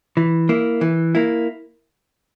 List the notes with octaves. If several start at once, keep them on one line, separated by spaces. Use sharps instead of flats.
E3
A#3 E4
E3
A#3 E4